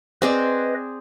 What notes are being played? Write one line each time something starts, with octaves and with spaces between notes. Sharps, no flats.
C4 G#4 B4 D5 D#5